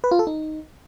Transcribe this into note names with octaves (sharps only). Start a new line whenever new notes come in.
B4
F4
A4
D#4